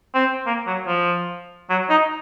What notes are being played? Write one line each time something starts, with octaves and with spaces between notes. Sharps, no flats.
C4
A#3
F#3
F3
F#3
D#4